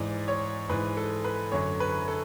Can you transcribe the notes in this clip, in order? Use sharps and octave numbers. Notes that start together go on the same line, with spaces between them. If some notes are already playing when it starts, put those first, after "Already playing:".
Already playing: G#2 E3 D5
C#5
G#2 E3 B4
A4
B4
F#2 D3 F#3 C#5
B4
A4